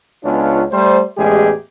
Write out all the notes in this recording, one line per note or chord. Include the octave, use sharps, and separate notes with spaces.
C#2 B3 C#4 D4 F4
G3 A3 C5
A1 E2 G#3 G4 G#4